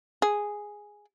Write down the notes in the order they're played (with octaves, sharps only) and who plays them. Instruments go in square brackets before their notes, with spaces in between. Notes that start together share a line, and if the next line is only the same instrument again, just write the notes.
[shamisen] G#4